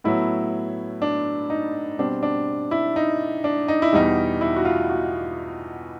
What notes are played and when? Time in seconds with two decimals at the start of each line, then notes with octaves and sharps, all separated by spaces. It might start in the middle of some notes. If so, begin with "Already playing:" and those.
0.04 A2 F#3 B3 E4
1.02 D4
1.50 D#4
1.99 B2 G3 C4 D4
2.23 D4
2.71 E4
2.96 D#4
3.44 D4
3.68 D#4
3.82 E4
3.93 E2 B2 G3 D#4
4.41 E4
4.56 F#4
4.65 F4
4.90 F#4